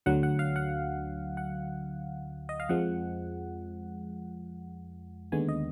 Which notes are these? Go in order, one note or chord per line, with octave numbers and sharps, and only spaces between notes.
D2 D3 F#3 F#5
F#5
F5
F#5
F#5
D#5
F5
F2 F3 G#3 F#5
D#2 D3 G#3 B3 G#5
D#5